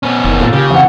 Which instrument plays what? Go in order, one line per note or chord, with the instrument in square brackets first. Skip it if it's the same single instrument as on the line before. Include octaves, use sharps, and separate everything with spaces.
[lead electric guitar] B3 C#4
[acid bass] F#1 [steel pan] D#3
[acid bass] A2 [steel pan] A#3 F4 A4
[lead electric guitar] C#3 [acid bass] G4
[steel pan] E3 C4 [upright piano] F5 F#5